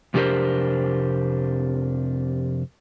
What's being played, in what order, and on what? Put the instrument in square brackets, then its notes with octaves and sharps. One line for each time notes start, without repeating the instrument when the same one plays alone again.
[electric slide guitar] F2 C3 D4 G4 A#4 C5